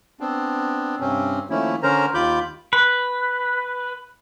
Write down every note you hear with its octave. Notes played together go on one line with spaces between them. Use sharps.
B3 C4 D4
G2 C3 C4 C#4
D#3 F3 A3 A#3 C#4 E4
D3 C#4 A#4 C5 A#5
D#2 D#3 F4 B5 D6 G6
B4